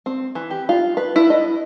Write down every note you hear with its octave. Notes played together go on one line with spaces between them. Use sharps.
C4
E3
G4
F4
B4
E4
D#5